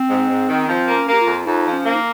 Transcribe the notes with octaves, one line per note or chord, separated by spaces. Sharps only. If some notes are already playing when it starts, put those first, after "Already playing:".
Already playing: C4
G#2
G#2
D#3
F3 C4
A#3
C#4
A#3
G4
F4
F2
F2 D#4
F3
C#4
A#3
D#4